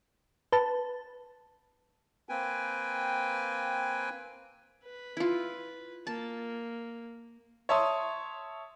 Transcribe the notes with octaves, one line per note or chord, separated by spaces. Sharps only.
B4 A5
A#3 C4 B4 G5 G#5
B4
E4 F4
A#3 A5
C#5 E5 A5 C6 D#6